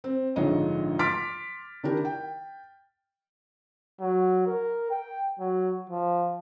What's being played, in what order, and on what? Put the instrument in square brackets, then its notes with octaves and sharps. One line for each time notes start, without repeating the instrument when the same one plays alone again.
[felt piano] C4
A#1 G#2 D3 F4 C#5 D#5
C6 D6 F6 A6 B6 D7
D#3 D4 E4 G4 A#4
G5
[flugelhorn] F#3
A#4
G5
F#3
F3